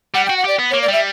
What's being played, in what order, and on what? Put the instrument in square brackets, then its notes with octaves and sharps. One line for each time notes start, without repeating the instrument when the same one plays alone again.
[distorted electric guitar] G3 [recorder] F#5
[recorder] G5
[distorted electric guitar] F#4
[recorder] F#5
[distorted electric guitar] G4 [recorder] D5
[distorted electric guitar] B3
[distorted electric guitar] A#3 [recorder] C#5
[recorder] D5
[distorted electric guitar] G3 [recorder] E5